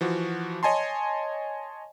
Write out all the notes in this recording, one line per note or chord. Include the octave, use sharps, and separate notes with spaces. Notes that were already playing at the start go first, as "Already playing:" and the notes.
E3 F3 F#4
C#5 D#5 G#5 A5 C6